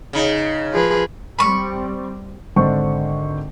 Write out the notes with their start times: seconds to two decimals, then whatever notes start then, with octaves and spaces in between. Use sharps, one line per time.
0.13 C#3 D#4
0.73 F3 G#4 B4
1.39 G3 C4 B5 C#6
2.56 G#1 D3 D4 C5 C#6